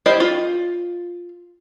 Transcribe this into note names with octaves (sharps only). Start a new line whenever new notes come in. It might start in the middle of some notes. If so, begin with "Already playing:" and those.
E4 G4 A#4 C5 D#5
F4